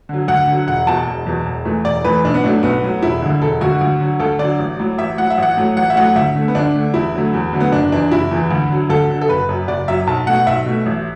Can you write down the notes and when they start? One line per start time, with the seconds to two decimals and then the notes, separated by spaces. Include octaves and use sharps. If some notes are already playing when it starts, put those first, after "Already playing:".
0.09 D3 F#3
0.28 D2 F#5
0.48 D3 F#3
0.67 E1 F#5
0.87 E2 B2 A5
1.06 E1
1.26 E2 B2
1.46 E1
1.65 E2 E3 A3
1.85 E1 D5
2.05 E2 E3 A3 B4
2.24 B1 D4
2.34 B3
2.44 A2 F#3 A3 D4
2.63 B1 B3
2.84 A2 F#3 A3
3.03 E1 E4
3.22 D2 D3
3.42 E1 A4
3.61 D2 D3 F#4
3.81 D2
4.00 D3 F#3
4.20 D2 A4
4.39 D3 F#3 D5
4.59 A1
4.79 A2 F#3
4.98 A1 E5
5.18 A2 F#3 F#5
5.30 E5
5.38 A1 F#5
5.57 A2 F#3 A3
5.77 A1 F#5
5.90 E5
5.96 A2 F#3 A3 F#5
6.16 D2 E5
6.35 D3 A3
6.48 B3
6.55 D2 D4
6.75 D3 A3
6.94 E2 E4
7.14 D3 F#3 A3
7.33 E2
7.53 D3 F#3 A3
7.60 B3
7.72 F#1 D4
7.92 E2 E3 D4
8.11 F#1 E4
8.31 E2 E3
8.51 D2
8.70 D3 F#3
8.89 D2 A4
9.09 D3 F#3
9.21 A4
9.29 F#1 B4
9.49 F#2 F#3
9.68 F#1 D5
9.88 F#2 F#3 E5
10.07 B1 A5
10.27 B2 A3 F#5
10.47 B1 E5
10.66 B2 A3
10.86 A1